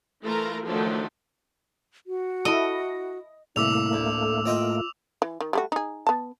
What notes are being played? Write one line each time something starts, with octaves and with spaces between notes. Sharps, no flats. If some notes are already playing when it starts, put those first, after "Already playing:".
E3 A3 F4 A#4 A#5
D#3 F3 F#3 A3 D4
F#4
E4 A4 D#5
C2 A2 A3 A#3 E4 D6 E6 F7
D2
A4
C4 F4 D#5 G5
E3
D#3
G3 A3 F#4
D#4 G#4
B3 A5